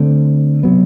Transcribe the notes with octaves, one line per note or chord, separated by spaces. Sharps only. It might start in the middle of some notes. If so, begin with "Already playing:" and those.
Already playing: D3 A3 C4
C3 F#3 B3